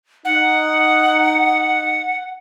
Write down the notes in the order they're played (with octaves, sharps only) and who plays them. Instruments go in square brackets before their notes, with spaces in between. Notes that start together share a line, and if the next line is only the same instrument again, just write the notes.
[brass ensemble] D#4 [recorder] F#5